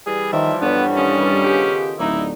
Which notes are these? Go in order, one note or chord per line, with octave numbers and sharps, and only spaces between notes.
E3 G3 G#4
D#3 F3 D5 E5
G2 B3 A4 C#5 F#5
D#3 C#4 F4 D#5
C#3 B3 G4
D1 D#4 E4 D5